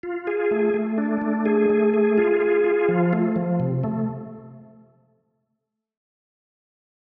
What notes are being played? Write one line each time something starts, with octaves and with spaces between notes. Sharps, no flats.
F4
G#4
A3
A3
D4
A3
G#4
A3
G#4
F4
G#4
F4
F3
A3
F3
C3
A3